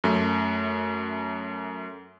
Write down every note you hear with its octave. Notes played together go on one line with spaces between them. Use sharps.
F#2 A3